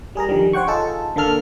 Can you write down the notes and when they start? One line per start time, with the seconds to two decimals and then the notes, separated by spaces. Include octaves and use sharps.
0.15 G3 G#4 A#4 A#5
0.29 D3 D#3 F3 G3
0.53 C5 C#5 F#5 G5 C#6
0.67 D#4 F4 G#4 A4 A5
1.16 D3 A#3 A4 F6